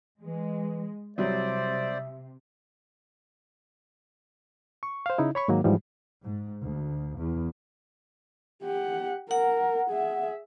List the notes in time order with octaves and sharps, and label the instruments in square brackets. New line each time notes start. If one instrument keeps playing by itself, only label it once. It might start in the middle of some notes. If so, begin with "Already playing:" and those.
[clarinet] E3 [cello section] G#3
[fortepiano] C2 F#3 [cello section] C3 [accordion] C5 D5 [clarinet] E5
[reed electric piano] C#6
C5 F5
C#3 D#4 E4
C#5 B5 C#6
G#2 D#3 F#3 A#3
G#2 E3 F3 G3
[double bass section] G#2
D2
E2
[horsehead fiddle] G4 F#5
[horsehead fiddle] A#4 [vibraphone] F#5
[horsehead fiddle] G#4 E5